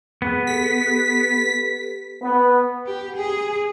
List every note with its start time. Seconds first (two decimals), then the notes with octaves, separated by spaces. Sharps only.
0.22 B3 G#4 F#5
0.47 G4 A4 B4 B6
2.22 B3
2.87 G4
3.17 G#4